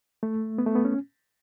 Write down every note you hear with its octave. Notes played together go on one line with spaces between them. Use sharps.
A3
B3
A3
B3
C#4